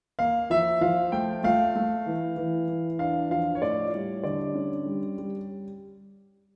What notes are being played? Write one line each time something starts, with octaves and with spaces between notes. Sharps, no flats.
A#3 F5
F3 E5
F3 F5
A3 G5
A3 F5
A3
E3
E3
E3
D4 F5
F3 F5
C#5
A2 D5
G3 C#5
D3 D5
C#4
G3
G3